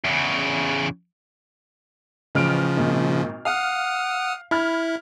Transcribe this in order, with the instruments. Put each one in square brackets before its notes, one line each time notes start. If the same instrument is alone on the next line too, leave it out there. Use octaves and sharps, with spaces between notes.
[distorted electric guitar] E2 C#3
[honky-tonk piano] A1 F6 D7 [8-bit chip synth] C#3 F3
[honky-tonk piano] G#1 A#2
[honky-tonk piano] F5 [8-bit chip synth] F#5 D#6 F6
[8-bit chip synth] E4 [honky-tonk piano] B5 F6 G#6